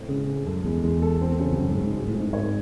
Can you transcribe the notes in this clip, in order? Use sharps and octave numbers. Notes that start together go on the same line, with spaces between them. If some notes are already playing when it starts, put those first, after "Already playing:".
Already playing: A2 C4
C#3 G#3
G#3
F#2 A4
E2 G#3
E2 G#3
A4
C4
C#3
E2
F#2 F#4
G#2
G#3
G#2
G#2 F#4
A2
C4
G#2
G#2 C#5